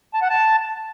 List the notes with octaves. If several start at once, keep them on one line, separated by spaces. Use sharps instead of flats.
A5
F#5
A5